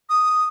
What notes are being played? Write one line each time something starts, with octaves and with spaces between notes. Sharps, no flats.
D#6